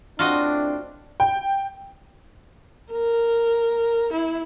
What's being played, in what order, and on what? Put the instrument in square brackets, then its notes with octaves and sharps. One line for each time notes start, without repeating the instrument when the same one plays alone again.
[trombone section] A2 C4 D4 [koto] F4 F#4 D#5
[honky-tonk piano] G5
[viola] A#4
E4